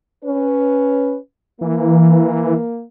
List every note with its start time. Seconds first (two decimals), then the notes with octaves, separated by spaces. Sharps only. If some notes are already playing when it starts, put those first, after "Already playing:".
0.25 C#4 B4
1.61 E3 A#3